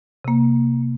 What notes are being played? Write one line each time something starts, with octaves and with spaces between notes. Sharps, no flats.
C3 A#3